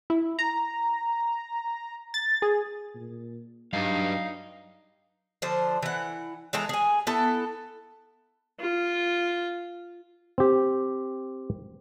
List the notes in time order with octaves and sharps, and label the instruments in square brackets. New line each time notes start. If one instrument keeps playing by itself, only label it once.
[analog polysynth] E4
A#5
A6
G#4
[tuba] A#2
[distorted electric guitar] G2 [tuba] F#3 [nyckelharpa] D#4 [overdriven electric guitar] F5
[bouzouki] D3 F3 C5
E3 F#5
E3 G#3 A4 A#5
G#4 G#5
B3 E4 A4
[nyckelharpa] F4
[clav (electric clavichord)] C4 G4